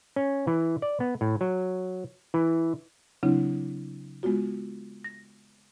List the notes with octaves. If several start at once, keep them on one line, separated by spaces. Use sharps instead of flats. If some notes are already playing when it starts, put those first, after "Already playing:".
C#4
E3
D5
B3
A2
F#3
E3
C#3 F#3 C4 D4 E4
G#3 B3 F4 F#4
A#6